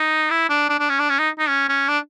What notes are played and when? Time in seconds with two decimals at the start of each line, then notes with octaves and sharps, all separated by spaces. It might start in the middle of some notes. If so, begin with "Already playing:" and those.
Already playing: D#4
0.30 E4
0.49 D4
0.69 D4
0.79 D4
0.89 C#4
0.99 D4
1.09 C#4
1.19 D#4
1.39 D#4
1.48 C#4
1.69 C#4
1.88 D4